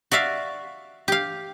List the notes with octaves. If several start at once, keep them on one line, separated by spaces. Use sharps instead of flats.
F#4 D5 E5 F5
G4 F5